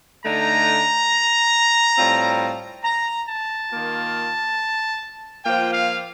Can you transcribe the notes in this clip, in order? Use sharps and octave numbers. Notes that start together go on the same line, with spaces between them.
D3 A3 D#4 A#5
A2 G3 C4 F4
A#5
A5
D#3 A#3 F4
F3 A#3 F4 G5
F5